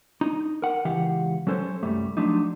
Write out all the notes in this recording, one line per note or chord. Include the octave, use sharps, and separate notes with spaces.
D#4
A#4 F#5
C#2 E3 G4 F5 F#5
F#3 C#4 A4 C5 C#5
C2 F#2 G3 A3
F3 F#3 A3 D4 D#4